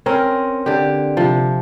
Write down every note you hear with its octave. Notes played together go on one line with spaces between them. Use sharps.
C4 C#4 A#4
D3 G4
C3 F3